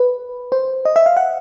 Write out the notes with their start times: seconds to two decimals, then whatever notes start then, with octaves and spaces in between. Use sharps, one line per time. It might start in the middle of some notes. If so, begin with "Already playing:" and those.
Already playing: B4
0.52 C5
0.85 D#5
0.96 E5
1.06 F5
1.17 F#5